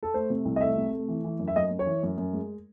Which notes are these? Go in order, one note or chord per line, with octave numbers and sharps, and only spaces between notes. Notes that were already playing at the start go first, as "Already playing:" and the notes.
A4
A3 C5
C3
C2
D#5
A3 E5
C3
A3
E3
E3
F#2
E5
F#2 D#5
F#2
C#5
E3
F#2
F#2
G#3